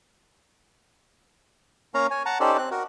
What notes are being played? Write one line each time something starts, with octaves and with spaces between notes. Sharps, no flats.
A#3 C#4 C#5 F5 A#5
C#5 G#5
F#5 A5 A#5
C#4 D#4 G4 A4 C5 D5
C4 F#6
F#4 A#4